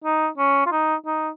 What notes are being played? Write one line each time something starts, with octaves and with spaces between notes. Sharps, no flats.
D#4
C#4
F4
D#4
D#4